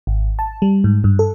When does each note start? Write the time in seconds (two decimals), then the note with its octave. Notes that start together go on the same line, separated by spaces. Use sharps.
0.07 G#1
0.39 A5
0.62 G3
0.84 G#2
1.04 G2
1.19 A4